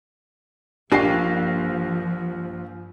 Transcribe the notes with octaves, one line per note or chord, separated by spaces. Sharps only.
A#1 G2 F3 A#3 G4 D#5 C7